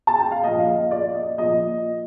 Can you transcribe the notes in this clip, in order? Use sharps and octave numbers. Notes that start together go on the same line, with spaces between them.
A5
G5
F5
A#2 F3 D#5
F5
D#5
D5
D#5
A#2 F3 D#5